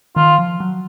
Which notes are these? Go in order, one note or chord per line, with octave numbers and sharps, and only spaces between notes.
D#3 F4
F3
F#3